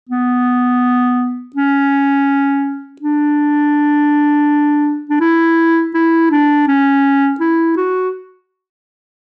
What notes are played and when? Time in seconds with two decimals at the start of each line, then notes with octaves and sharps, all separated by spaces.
0.09 B3
1.56 C#4
3.01 D4
5.10 D4
5.21 E4
5.94 E4
6.31 D4
6.68 C#4
7.40 E4
7.77 F#4